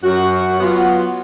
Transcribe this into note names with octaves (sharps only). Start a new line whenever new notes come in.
F#2 F#4
F#3 B3 F4 F#4